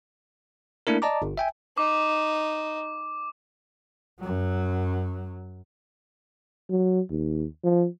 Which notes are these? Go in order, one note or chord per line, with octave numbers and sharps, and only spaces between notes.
A3 A#3 D4 E4 A#4
D5 D#5 A5 A#5 D6
G1
E5 G5 G#5
D#4 D6
F#2 F#3
F#3
D#2
F3